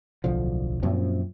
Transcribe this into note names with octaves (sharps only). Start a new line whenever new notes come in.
D1 B1 D3 F3
F#2 A#2 F3 C4